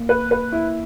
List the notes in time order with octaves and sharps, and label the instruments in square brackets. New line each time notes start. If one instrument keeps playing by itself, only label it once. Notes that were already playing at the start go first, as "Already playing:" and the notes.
Already playing: [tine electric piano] A#3
[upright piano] B4
B4
E4